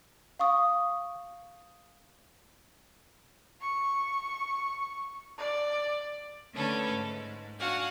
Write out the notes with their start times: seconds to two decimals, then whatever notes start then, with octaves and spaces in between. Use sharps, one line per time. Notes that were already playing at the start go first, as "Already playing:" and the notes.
0.39 F5 C#6 D#6
3.61 C#6
5.38 D5
6.53 D3 A3 C#4 A4 B4
6.92 G#2
7.59 D4 F#4 F5 F#5 G#5